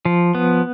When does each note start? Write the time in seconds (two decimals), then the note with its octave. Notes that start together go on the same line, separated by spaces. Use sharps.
0.05 F3
0.35 B3